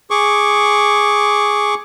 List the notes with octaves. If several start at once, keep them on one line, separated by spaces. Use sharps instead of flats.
G#4 C#6 D6